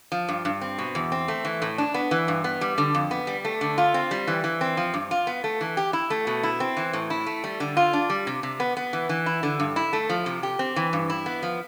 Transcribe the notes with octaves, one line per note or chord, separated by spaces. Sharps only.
F3
G2
G2
C4
B2
E2
C4
A3
E3
A2
D4
B3
E3
G2
B3
G3
D3
F2
B3
G3
A3
D3
F4
C4
G3
E3
E3
C4
F3
G2
F4
B3
A3
E3
G4
E4
A3
B2
E4
C4
E3
A2
E4
A3
G3
D3
F4
D4
G3
C3
C3
B3
B3
E3
E3
E4
D3
G2
E4
A3
F3
C3
G4
C4
E3
G2
E4
B3
F3